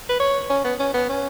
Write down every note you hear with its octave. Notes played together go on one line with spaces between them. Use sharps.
B4
C#5
C#4
B3
C#4
B3
C#4